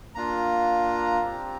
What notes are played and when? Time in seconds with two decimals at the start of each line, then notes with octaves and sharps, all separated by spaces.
0.15 A#3 D4 F4 A#5
1.21 C4 G4